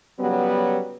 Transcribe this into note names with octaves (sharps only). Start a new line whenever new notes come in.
C#3 F#3 G3 B3